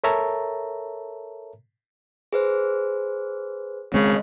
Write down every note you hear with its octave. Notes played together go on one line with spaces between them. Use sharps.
A4 A#4 C#5 E5 A5 A#5
G#4 B4 C5
C#3 G#3 C4